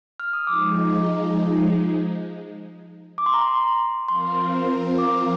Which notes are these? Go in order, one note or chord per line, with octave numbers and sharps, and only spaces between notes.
F6
D#6
F3 G#3 D#4 D6
D6
C6
A#5
C6
F3 C4 F4 A#4 C6
D6